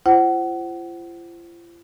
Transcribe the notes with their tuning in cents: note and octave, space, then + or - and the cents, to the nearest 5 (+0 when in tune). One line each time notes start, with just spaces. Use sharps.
F4 -45 C5 +0 F#5 +25